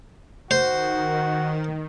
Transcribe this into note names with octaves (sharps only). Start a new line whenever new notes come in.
D#3 F#4 C5